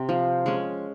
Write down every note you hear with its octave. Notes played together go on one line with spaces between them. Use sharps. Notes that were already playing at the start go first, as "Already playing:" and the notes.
Already playing: C3
F3
G#3 C#4